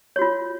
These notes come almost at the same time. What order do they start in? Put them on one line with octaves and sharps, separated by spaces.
C#5 F#4 F4